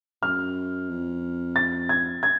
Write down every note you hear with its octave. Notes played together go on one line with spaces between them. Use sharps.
F#2 F6
F2
A6
G#6
G#6